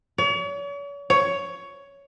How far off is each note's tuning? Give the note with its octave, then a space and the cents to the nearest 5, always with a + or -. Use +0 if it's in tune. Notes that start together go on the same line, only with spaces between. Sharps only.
C#5 +40
C#5 +10